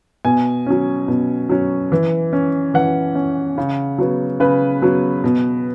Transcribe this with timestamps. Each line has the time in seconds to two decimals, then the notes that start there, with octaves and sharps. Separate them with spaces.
0.25 B2 G#5
0.66 F#3 C#4
1.08 B2
1.49 F#3 C#4
1.92 E3
2.33 C#4
2.74 E3 F#5
3.15 C#4
3.58 C#3
3.98 F#3 B3
4.40 C#3 B4
4.82 F#3 B3
5.24 B2